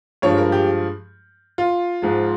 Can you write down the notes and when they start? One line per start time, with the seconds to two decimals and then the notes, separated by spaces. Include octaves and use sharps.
0.22 G2 F3 G#3 C#5
0.38 A#4
0.52 G4
1.58 F4
2.02 G#2 F3 G#3